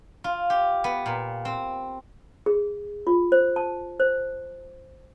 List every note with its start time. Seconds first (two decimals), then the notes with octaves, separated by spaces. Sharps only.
0.24 F4
0.50 G4
0.84 B3
1.06 A#2
1.45 C4
2.46 G#4
3.07 F4
3.32 C5
3.56 A5
4.00 C5